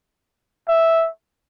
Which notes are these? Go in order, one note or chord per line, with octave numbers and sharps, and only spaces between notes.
E5